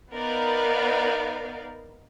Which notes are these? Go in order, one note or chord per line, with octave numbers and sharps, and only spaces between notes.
B3 D#4 A#4 B4 D5 F5